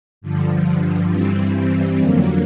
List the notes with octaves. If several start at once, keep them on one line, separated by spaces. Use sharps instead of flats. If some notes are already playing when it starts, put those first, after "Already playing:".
G2 D3 F3
G2 E3 G3 C4
F2 D3 F#3 A#3